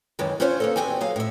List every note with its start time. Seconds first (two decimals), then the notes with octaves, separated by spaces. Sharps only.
0.19 F#2 D#3 E3 G#3
0.40 C#4 D4 F4 C5 C#5
0.60 A#3 B3 A4
0.76 E2 G2 B2 C4 G4 G#5
1.01 F#3 G#4 F5
1.16 A2 E5